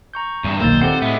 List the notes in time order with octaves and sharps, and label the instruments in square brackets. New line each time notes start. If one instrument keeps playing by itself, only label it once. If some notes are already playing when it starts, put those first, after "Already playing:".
[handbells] A#5 C#6 G6
[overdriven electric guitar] E2 C3 [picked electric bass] G2
[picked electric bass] D#1 D#3 [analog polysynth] B1 A#3 [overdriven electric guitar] C5 [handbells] A#5 E6 A6
[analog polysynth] C4 [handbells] G4 A4 F#5 [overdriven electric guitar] C5
[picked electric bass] A2 [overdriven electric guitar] G#3 B3 [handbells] E5